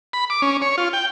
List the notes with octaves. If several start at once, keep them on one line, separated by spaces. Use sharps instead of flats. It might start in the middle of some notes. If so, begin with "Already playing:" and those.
B5
D6
C#4
C#5
F4
G5